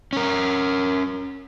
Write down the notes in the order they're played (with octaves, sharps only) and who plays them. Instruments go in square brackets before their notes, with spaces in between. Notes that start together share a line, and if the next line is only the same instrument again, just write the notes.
[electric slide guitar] C#4 A#4